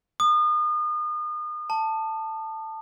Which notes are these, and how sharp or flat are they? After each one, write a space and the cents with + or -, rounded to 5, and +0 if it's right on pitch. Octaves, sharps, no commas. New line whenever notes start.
D#6 -35
A5 +10